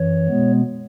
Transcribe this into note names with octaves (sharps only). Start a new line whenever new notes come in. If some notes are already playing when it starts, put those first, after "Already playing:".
Already playing: F#2 E3 C#5
B2 G#3 B3